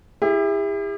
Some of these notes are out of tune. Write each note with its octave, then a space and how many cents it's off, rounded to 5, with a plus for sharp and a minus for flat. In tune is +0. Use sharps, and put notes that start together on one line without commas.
E4 +0 G4 +45